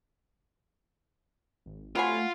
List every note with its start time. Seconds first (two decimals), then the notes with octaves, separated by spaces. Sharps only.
1.66 G#1
1.96 C3 F#3 A3 F4 F#5 G#5 B5 C6